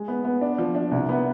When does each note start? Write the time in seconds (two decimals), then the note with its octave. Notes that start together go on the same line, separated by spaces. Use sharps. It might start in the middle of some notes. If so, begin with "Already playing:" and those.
Already playing: G#3
0.08 B3
0.25 B3
0.41 D4
0.58 F3
0.75 D4
0.91 C2
1.09 B3